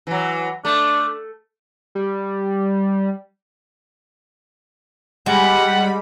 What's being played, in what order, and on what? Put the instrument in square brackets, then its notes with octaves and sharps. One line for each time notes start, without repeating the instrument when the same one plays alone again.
[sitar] E3 F#3
[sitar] A3 [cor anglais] D4
[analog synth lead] G3
[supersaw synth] G3 B5 [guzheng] G#3 [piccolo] F#5